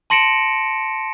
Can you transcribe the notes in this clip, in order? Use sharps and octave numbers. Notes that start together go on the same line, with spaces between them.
A5 C6 A#6 C#7 D7 E7